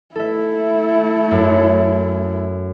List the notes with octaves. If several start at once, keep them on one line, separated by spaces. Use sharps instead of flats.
A3 E4 A4 E5
F#2